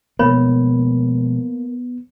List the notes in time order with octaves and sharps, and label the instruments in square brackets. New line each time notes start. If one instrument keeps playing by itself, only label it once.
[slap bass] B2 F3 G#3 [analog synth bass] A#3 [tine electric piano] B3 [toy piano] C5 C#5 B5